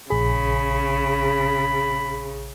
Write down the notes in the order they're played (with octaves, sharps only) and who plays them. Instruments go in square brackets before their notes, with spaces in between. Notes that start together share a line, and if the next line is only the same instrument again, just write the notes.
[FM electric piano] A#1 G#4 [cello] C#3 [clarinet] B5